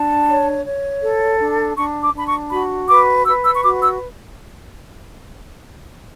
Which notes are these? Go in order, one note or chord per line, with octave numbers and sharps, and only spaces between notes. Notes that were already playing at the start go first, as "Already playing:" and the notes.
Already playing: D4 A5
C#5
C#5
A4
D4
D4 C#6
D6
D4 B5
C#6
F#4 B5
B4 D6
B4 E6
E6
C#6
F#4 D6
E6